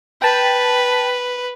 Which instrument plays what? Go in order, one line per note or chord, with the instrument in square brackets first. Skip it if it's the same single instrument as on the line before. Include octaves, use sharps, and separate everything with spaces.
[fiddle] B4 [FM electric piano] G5 A5 B6